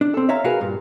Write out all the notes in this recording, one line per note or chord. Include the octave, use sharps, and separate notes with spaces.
D4
C4 A4
C#5 E5 F5 A#5
F#4 G#4 A#4 B4 F5
G2 A#2